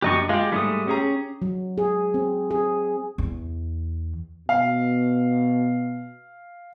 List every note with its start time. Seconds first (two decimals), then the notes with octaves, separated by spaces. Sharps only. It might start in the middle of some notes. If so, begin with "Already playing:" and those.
0.02 F#2 D4 G4 D#5 C#6 F#6
0.29 G#3 F4 G4
0.52 G#2 G3 A3 D#6
0.87 C#4 G4 G#4 A#5
1.42 F#3
1.78 G#4
2.14 C4
2.51 G#4
3.18 E2
4.49 B2 F5